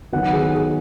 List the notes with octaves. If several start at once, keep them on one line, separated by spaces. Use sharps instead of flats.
D#3 F#3 B3 F#5
G#4
G#4